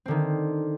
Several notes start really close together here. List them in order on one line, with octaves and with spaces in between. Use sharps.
C4 D3 D#3